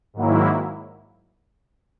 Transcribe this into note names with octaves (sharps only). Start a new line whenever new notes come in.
G#2 D#3 F#3 A#3 E4